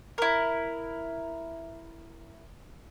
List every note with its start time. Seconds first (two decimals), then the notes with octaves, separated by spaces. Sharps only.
0.18 E4 A#4